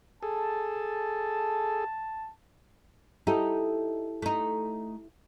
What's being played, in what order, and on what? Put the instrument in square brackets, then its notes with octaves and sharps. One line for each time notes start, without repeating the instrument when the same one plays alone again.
[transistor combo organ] G#4 A4 [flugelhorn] A5
[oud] D#4 [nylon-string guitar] E4 G4 A4
[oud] A3 D#4